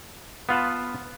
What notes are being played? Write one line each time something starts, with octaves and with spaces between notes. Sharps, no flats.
B3 F4 B4 A5